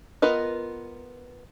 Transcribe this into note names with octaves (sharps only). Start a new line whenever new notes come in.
B3 F4 A#4 B4 D#5